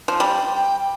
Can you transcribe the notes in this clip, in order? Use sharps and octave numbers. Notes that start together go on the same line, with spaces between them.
F3
G3 G5 A5
G5